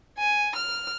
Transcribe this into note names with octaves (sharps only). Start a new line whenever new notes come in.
G#5
F6